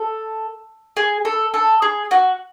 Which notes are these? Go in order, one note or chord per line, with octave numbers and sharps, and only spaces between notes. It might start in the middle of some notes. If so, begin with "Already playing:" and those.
Already playing: A4
G#4
A4
A4
G#4
F#4